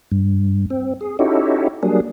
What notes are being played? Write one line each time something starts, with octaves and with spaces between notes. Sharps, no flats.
G2
C4
G#4
C#4 D#4 E4 F#4 G4 A4
F#3 G3 A#3 D4 G#4